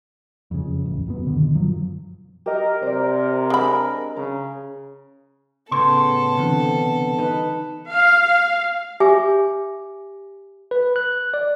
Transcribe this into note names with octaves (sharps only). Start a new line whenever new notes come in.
F2 C#3
D1 A1
F#1 F#2 B3
D2 B2 D3 D#3
G1 F#2 F3 F#3
G4 A#4 D#5
C3 C5 D5
G#3 D4 D#5 G#5 B5
C#3 A#5
A2 C#3 B3 C#4 A4 C6
C2 D3 E3 C4
D#4 B4
F5
G4 C#5 E5 G#5 D6
B4
F#6
D5